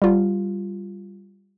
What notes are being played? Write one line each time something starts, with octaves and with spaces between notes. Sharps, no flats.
G3 F4